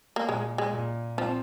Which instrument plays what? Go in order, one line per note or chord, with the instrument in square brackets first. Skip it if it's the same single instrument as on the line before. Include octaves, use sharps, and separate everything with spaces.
[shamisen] A#3
[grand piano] A#2 [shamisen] G#3
[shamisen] G#3
[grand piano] A#2
[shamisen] F3 [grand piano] C4